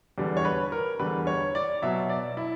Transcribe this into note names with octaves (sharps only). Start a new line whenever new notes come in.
E2 D3 G3
C#5
B4
A#4
E2 D3 G3 B4
C#5
D5
B2 F#3 E5
D5
E4